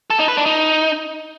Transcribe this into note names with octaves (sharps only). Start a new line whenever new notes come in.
A4
D#4
B4
D4
D#4